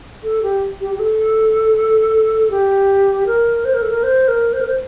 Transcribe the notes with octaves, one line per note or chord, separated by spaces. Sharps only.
A4
G4
G4
G4
A4
G4
A#4
C5
A#4
A4
A#4
C5
A#4
C5
A#4
C5